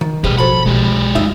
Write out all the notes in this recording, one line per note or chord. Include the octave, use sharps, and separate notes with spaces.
D#3
A1 B2 G3 G4 G#4 B4
F3 F#3 A4 B5
B1 G#3 G4
F#2 D#4 F4 E5